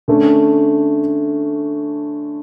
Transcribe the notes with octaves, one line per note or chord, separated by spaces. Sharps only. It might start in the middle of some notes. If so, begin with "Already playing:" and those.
D3 A3 C#4